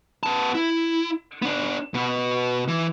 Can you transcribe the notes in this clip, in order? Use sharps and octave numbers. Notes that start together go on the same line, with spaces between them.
B3 A5
E4
B3 D4
B2 B3
E3